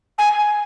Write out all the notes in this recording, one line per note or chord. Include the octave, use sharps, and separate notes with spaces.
G#5